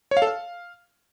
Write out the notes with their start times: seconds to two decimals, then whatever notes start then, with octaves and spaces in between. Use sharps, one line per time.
0.11 C#5
0.17 F5
0.22 A4
0.27 F5